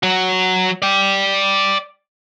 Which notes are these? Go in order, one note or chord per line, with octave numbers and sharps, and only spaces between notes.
F#3 F#4
D5 G5